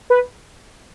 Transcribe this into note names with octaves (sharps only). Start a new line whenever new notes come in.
B4